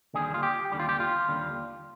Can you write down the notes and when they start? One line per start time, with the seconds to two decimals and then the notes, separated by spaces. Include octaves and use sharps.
0.14 D#2 D3 G3 G#4
0.34 F4
0.43 G4
0.72 D#2 D3 G3 G4
0.80 F4
0.89 G4
1.00 F4
1.28 D#2 D3 G3